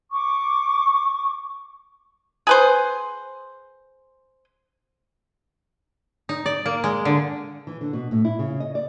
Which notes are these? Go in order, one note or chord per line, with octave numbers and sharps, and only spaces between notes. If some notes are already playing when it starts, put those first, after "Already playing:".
C#6 D6
G#4 B4 C5
D#4
D5
A#3
G#3
D3
E3
D3
B2
A2
E4
C#3
D#5
D5